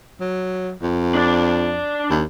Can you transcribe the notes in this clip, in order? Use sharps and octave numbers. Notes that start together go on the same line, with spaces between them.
F#3
F2
D4 D5
D#2